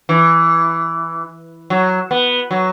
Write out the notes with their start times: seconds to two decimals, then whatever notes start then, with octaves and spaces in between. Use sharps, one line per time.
0.09 E3
1.70 F#3
2.11 B3
2.51 F#3